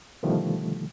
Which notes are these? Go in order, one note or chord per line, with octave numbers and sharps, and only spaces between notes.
B2 D3 D#3 F3 G3 A3